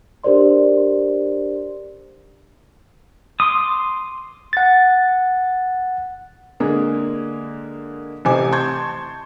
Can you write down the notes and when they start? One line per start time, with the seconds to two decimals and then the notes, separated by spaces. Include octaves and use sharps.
0.24 D4 G4 A#4 C5 D5 C6
3.40 C6 D6 D#6
4.53 F#5 A6
6.60 D3 G#3 A#3 G#4
8.25 A1 C3 G4 C5 G#5 D6
8.52 A5 C6 C#6 G6 G#6